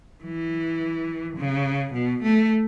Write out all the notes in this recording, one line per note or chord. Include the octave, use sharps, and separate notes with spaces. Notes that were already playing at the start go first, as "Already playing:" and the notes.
E3
C#3
B2
A3